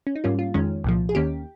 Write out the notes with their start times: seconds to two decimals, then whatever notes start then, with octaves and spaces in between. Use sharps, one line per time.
0.07 C#4
0.16 D#4
0.24 G#2 G3 A#3 C#4 F4
0.39 F4
0.54 F2 D#3 G#3 C#4
0.84 C2 A#2 F3
1.09 G#4
1.15 D#2 D#3 A#3 C#4 G4